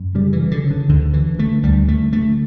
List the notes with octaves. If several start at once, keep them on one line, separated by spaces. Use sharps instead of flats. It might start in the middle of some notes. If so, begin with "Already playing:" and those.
Already playing: F#2
C#3 G3
E3
C#3
D3
C#3
D3
D2 D3
D3 E3
D3 A3
D2 G3
D3 A3
D3 A3